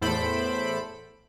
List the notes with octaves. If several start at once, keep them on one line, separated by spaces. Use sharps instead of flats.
E2 A2 A4 C5 B5 D7